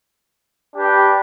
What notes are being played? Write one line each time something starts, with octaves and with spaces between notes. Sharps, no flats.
D4 G4 B4